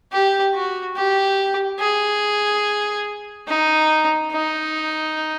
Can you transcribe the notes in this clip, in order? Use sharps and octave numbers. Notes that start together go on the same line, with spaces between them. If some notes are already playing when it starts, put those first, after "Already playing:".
G4
F#4
G4
G#4
D#4
D#4